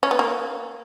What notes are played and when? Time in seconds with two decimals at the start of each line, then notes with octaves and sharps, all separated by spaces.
0.03 C#4
0.11 B3
0.19 A#3